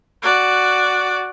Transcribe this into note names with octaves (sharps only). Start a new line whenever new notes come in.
F#4 D5